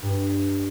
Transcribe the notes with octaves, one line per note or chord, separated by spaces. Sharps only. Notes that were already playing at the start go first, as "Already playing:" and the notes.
G2